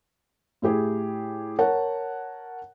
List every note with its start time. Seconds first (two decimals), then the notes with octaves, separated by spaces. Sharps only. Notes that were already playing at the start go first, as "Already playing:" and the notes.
0.62 A2 E4 G4 G#4
1.59 A#4 C#5 F#5 A5